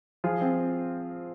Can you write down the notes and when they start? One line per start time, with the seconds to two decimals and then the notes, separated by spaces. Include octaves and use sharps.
0.24 F3 F4 G#4
0.41 C4